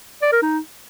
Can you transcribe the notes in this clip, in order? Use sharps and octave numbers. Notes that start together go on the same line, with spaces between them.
D5
A#4
D#4